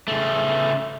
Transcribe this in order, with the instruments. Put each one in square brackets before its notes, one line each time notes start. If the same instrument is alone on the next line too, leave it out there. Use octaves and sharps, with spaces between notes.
[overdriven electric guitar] C#3 A3